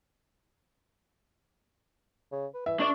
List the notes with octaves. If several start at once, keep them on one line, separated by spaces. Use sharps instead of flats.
C#3
B4
E3 E5
C#2 D4 D5 C#6